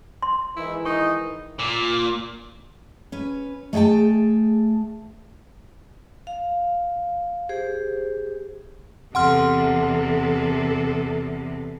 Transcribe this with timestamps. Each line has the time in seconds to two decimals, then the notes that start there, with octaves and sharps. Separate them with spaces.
0.22 C6
0.57 G#2 D#3 E3 E4
0.85 D#4 C#6
1.59 A#2
3.12 C#4 B4
3.73 A3 G#4 C#5 G5 A5
6.27 F5
7.49 G4 G#4 C5
9.15 E2 C3 A4 F#5 C6 F6